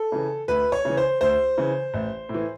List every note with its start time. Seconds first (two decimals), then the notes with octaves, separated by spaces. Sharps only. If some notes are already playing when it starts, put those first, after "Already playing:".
Already playing: A4
0.12 C#3 E3
0.48 D2 B4
0.72 C#5
0.85 C#3 E3
0.97 C5
1.21 D2 C5
1.58 C#3 E3
1.94 A1
2.29 A2
2.34 E3